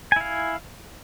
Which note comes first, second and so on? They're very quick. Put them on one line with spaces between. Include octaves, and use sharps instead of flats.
G#5 E4 F5